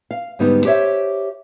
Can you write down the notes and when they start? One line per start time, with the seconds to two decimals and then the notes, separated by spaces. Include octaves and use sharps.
0.11 F5
0.39 G#2 D3 G3 B3 D#4
0.65 G4 C5 C#5 E5